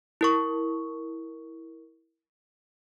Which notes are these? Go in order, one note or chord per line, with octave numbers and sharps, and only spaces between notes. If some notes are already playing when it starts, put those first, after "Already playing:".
E4 A#4 C#6